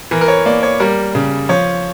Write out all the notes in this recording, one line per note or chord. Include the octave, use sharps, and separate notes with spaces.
E3 A#4
A#4
C#5
A#3 D5
C#5
G3 A#4
C#3
F3 C#5